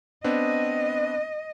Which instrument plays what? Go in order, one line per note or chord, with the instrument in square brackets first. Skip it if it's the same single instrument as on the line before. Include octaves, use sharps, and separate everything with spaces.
[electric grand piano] B3 C4 D4 [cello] D#5